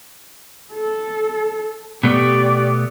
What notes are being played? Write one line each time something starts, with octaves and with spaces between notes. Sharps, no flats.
A4
B2 A3 B3 G4 D5